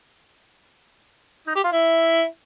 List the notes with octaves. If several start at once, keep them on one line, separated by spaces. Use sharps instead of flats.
D#4
G4
F4
E4